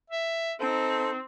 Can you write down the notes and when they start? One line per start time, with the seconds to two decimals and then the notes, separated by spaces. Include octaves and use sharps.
0.10 E5
0.60 C4 D#4 A4 C5